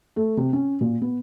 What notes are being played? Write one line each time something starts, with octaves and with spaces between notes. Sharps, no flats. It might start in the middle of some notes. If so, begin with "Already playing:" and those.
A3
C3
C#4
A#2
B3